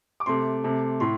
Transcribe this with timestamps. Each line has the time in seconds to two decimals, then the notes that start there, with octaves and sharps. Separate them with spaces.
0.20 D6
0.26 C3 A3 C6
0.64 C3 A3
1.00 A2 C6